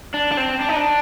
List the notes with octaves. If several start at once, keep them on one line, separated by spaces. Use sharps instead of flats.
D4
D4
C4
D4
D#4
D4